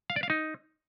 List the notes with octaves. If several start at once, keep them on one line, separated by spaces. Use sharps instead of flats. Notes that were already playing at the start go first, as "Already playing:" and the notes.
F5
D5
F5
D#4